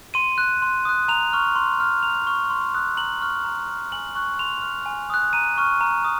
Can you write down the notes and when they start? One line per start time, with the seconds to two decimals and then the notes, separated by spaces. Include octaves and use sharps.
0.14 C6 D#7
0.38 F#6
0.62 C6
0.85 D#6 F#6
1.08 A#5 F7
1.33 C#6 F6
1.56 C6
1.80 F6
2.03 A#5 F7
2.27 C#6 F6
2.50 C6
2.74 D#6 F#6
2.97 A#5 F#7
3.21 C#6 F6
3.44 A#5
3.68 F6
3.92 G#5 F#7
4.15 C#6 F#6
4.39 C6 F7
4.62 F6
4.86 G#5
5.10 D#6 F#6
5.33 A#5 D#7
5.58 C#6 F6
5.81 A#5
6.05 D#6